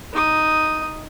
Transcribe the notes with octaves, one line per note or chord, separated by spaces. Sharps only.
D#4 D#6